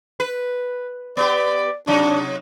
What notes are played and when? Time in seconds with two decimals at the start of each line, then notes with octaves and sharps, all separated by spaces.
0.20 B4
1.17 B3 G4 D5
1.87 C3 F#3 D4 D#4